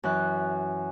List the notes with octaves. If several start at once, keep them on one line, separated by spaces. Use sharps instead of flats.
F#2 E3 F#6